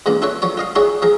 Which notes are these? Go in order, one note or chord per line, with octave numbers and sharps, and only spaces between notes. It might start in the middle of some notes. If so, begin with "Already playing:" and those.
E2 A#2 D3 A#3
E4 F4 A4 B4 C#5
F3 F#3 C#5 D5
F4 D#5 F5
D#4 E4 F#4 G#4 C#5 D5
F3 G#4 A#4